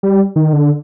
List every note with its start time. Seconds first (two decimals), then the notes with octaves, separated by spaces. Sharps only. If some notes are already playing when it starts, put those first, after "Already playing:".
0.03 G3
0.36 D#3
0.53 D3